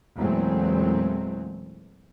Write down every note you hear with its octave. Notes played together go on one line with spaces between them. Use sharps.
E2 A#2 F#3 G#3 A3 C4